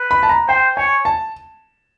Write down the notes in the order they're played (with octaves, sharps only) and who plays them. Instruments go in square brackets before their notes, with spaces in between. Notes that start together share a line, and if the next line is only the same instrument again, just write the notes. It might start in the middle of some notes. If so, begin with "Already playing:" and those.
Already playing: [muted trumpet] B4
[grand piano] B5
A5
A#5
[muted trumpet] C5 [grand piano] G5
[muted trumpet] C#5 [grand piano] G#5
[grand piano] A5